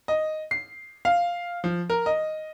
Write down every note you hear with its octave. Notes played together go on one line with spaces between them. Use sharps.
D#5
C7
F5
F3
A#4
D#5